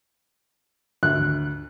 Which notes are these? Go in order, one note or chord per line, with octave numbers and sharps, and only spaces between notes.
D2 F#6